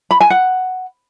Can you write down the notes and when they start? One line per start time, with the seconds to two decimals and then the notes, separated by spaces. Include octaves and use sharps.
0.11 B5
0.20 G#5
0.30 F#5